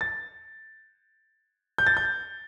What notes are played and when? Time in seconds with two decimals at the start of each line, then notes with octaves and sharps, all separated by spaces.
0.01 A6
1.78 G6
1.87 A6
1.97 G6